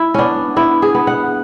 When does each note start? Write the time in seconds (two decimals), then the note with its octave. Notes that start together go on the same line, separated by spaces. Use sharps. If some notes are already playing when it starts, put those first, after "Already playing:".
Already playing: E4
0.14 B3 C#4 D4
0.56 B3 E4
0.82 G#4
0.94 B3
1.07 F#5